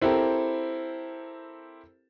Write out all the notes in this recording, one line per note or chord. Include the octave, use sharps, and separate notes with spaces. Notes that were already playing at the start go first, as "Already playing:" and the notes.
C4 E4 G4 A4 A#4